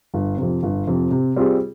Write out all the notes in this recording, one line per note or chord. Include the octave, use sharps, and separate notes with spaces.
G1
F2 C3
G1
F2 C3
C3
G3 C4 F4 G#4